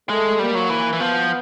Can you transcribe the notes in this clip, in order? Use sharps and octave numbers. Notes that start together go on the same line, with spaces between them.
G#3 A3
G3 A#3
F#3
E3
E3
F3 B3